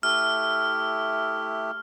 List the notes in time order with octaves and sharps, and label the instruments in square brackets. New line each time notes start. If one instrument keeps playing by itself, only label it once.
[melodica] A3 E4 G4 [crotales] F6